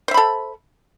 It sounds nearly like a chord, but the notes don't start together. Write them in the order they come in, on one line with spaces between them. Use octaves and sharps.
C5 E5 B5 A4